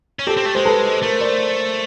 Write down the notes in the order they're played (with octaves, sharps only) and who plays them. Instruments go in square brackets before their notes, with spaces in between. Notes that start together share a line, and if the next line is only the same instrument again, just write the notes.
[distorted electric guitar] C#4
[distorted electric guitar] C4 [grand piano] G4 A4
[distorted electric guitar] C4
A3
[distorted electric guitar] G#3 [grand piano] C5
[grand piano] A4 B4
[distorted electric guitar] A3 [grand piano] A#4 C5
[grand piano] C5 D5